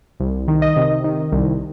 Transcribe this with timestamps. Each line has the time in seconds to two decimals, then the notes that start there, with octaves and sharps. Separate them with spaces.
0.20 C2
0.48 D#3
0.62 D#5
0.76 C3
1.04 D#3
1.32 C2